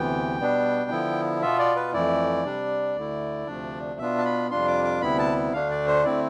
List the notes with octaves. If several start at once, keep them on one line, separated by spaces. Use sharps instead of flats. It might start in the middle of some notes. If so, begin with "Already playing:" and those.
Already playing: D2 C3 E3 B3 G5
B2 G3 B3 D4
D3 F3 B3 E4
B2 B3 F4 E5
D5
B4
F2 E3 A3 E4 D5
C3 G3 D4
D2 D3 A3 E4
D2 C3 F3 A3 D4
B2 B3 D4 F4 E5
A5
B5
F2 C3 G3 D4 F4 C6
D6
D6
D2 C3 G3 B3 E4 B5
A5
D2 D3 A3 D4 F5
D5
C5
D3 A3 C4 E4 D5